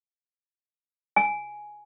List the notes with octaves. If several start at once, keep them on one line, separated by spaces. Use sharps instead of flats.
G#5